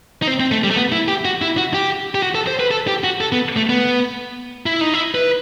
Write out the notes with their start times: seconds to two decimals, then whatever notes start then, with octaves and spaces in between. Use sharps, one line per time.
0.22 D#4
0.27 C4
0.40 C4
0.52 A3
0.64 G3
0.71 A3
0.76 B3
0.92 E4
1.08 G4
1.25 F#4
1.42 E4
1.58 F#4
1.74 G4
2.15 G4
2.22 F#4
2.35 A4
2.47 C5
2.60 B4
2.71 A4
2.88 G4
3.04 F#4
3.21 A4
3.32 B3
3.56 A3
3.69 B3
4.66 E4
4.81 D#4
4.94 E4
5.15 B4